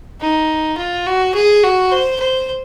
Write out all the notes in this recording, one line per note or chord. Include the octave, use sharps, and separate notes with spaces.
D#4
F4
F#4
G#4
F#4
C5
C5